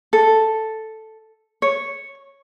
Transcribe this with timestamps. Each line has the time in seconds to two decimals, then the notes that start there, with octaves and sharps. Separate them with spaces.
0.13 A4
1.62 C#5